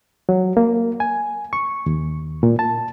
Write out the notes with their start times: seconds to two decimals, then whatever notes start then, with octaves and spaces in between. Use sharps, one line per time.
0.29 F#3
0.57 A#3
1.00 G#5
1.53 C#6
1.86 D#2
2.43 A#2
2.59 A5